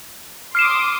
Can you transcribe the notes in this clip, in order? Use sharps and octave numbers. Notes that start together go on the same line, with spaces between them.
C6 D6 D#6 F6 C7 E7